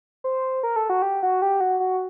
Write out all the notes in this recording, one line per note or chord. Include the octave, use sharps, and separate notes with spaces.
C5
A#4
A4
F#4
G4
F#4
G4
F#4
F#4